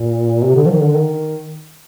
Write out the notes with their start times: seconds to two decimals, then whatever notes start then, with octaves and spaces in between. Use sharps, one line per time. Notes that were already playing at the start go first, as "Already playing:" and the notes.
Already playing: A#2
0.43 C3
0.56 D3
0.66 F3
0.70 D#3
0.83 D3
0.96 D#3